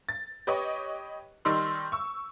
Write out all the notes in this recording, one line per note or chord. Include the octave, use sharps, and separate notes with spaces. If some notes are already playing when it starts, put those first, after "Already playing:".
A6
G4 B4 C#5 D#5 C#6
D#3 G3 D#4 C6 E6
C#6 E6